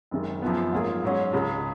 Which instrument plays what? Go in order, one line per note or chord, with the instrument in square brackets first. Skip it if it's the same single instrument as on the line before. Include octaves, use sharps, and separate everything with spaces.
[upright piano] F#1 F#2 D#3 G#3
F#2 F3 B3
G#2 F#3 A#3 F4 G#4
G#2 F#3 C#4
C#2 C#3 G#3